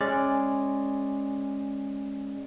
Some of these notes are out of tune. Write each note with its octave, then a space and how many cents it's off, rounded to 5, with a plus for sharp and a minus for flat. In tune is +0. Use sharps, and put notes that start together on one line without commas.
G#3 +0 C#4 -15 D5 +0